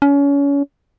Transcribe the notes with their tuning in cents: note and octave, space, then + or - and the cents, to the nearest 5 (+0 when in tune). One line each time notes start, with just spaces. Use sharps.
C#4 +30